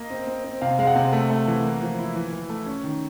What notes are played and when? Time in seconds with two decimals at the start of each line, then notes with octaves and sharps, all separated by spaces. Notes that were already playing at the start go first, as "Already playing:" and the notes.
Already playing: A#3 D#5
0.10 C4
0.27 C4
0.44 C4
0.62 C3 F5
0.79 G#3 F5
0.87 F#5
0.96 C3
1.13 A3
1.30 A3
1.47 E3
1.64 A#3
1.81 F3
1.99 E4
2.15 E3
2.33 E3
2.50 A3
2.66 C#4
2.84 D#3